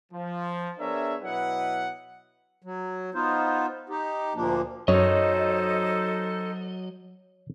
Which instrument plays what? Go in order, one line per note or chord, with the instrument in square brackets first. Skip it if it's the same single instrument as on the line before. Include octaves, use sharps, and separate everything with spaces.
[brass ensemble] F3
B3 D4 G#4 A#4 C#5 E5
B2 F#3 E4 B4 D#5 F#5
[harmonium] F#3
B3 D#4 F4 C5
D#4 G4
D2 A#2 F3 A#3 D4
[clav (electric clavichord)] F#2 [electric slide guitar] F#3 D#5 [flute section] D#4 A4 C5 [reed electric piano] C#5